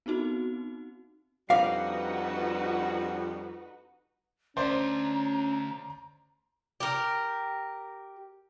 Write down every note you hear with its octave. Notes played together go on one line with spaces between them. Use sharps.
B3 C4 D#4 F#4
F2 G3 D4 D#4 F#4 B4 D5 F5
D2 C#4 C5 D5 A#5
G4 A#4